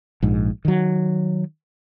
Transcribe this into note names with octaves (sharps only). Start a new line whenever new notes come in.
A#1 G#2
D#3 F#3